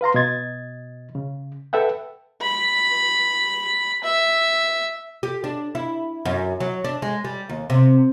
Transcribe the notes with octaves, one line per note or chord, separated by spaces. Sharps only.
B4 F5 A#5 C6
B2 D#5 G#6 A6
C#3
A4 B4 E5 F#5 G5
B5
E5
G4
D4
E4
F#2
F#3
D4
G#3
G3
D#2
C3